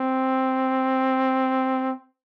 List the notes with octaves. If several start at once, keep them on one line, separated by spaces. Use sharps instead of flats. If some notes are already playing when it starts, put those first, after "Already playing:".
Already playing: C4